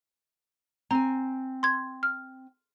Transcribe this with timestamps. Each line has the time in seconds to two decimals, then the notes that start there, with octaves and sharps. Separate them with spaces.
0.91 C4 G#5 A#5
1.63 C6 G#6
2.03 F6